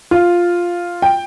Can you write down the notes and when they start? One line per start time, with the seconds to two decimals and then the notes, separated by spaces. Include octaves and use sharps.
0.11 F4
1.02 G5